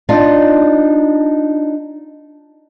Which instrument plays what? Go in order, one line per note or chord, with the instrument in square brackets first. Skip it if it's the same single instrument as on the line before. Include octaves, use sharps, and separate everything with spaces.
[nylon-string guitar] D4 D#4 F4 D5 D#5